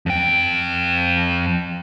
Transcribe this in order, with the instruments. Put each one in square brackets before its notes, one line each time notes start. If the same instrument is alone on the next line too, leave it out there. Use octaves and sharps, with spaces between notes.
[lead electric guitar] F2 G5